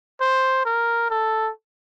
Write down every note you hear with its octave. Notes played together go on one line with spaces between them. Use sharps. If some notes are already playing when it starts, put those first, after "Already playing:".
C5
A#4
A4